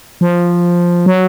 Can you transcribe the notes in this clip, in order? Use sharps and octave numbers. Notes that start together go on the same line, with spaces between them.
F3
F#3